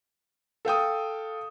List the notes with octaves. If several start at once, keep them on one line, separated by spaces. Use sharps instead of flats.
A4 F5 G5 D#6